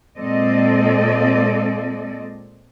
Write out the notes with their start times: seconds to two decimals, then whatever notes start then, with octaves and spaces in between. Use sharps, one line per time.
0.18 A#2 G#3 C4 A4 D5 D#5